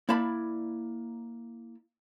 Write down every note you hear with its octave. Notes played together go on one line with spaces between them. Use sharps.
A#3 E4 D5 A5 B5